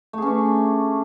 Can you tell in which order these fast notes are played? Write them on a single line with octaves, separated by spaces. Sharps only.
A3 G#4 C#4 D4